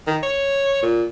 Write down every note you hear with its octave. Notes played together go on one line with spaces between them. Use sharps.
D#3
C#5
A#2